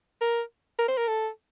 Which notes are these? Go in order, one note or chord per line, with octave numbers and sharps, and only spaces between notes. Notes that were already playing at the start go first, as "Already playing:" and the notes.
A#4
A#4
C5
A#4
A4